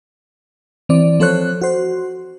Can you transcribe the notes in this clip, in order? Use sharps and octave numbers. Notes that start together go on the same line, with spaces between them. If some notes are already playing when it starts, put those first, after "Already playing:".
E3 C4 D5
F3 C4 A4 C5 C#5 F#6
F#4 C5